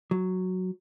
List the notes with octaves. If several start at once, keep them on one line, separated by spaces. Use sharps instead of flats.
F#3